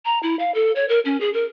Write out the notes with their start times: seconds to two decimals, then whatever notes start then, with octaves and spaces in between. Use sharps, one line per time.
0.05 A#5
0.23 E4
0.39 F5
0.55 A4
0.76 C#5
0.89 A#4
1.05 C#4
1.21 G#4
1.34 A#4